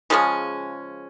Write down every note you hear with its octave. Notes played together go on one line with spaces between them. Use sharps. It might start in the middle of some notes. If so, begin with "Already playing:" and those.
C#3 F3 G#3 C#4